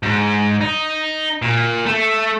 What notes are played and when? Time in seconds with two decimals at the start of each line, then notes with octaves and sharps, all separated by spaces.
0.03 G#2
0.61 D#4
1.42 A#2
1.86 A3